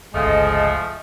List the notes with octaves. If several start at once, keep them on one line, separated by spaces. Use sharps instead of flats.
G1 C#2 C#3 F3 G#3 A3 D#5 G#5